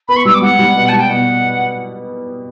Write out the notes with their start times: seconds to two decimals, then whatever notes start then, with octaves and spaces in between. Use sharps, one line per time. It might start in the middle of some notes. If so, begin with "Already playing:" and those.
0.08 B3 B5
0.16 C#6
0.25 G3 E6
0.34 D6
0.42 G3 F#5
0.59 G3
0.76 B2
0.89 G3 A5
0.99 G5
1.09 B2 F#5